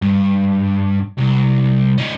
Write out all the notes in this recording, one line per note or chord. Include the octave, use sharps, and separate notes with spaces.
G2
C2
C#4 D#4